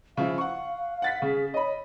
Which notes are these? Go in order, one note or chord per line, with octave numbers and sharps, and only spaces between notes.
C#3 F3 E4 F5
F#5 C#6
F#5 A6 B6
C#3 G#4
C#5 D#5 B5